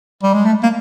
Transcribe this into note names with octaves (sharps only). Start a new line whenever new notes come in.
G3
G#3
A3
A#3